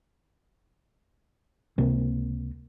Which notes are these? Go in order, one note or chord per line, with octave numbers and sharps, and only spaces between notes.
C#2 C3 A#3 C4